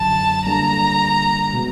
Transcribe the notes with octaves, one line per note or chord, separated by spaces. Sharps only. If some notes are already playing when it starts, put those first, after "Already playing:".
Already playing: F#2 D3 F#3 A5
D3 G3 A#3 A#5
B2 G#3 B3